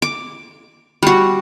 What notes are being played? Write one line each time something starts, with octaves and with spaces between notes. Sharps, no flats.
D6
G3 F#4